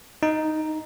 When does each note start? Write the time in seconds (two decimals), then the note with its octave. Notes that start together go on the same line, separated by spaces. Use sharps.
0.23 D#4